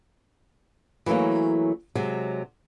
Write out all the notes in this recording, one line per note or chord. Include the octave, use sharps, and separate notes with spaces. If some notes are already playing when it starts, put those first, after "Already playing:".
E3 F#3 A3 A#3 C#4
C3 F#3 G#3